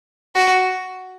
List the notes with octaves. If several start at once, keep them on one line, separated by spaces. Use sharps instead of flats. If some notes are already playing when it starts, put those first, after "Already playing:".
F#4